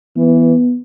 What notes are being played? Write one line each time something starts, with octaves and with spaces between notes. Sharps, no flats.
E3 B3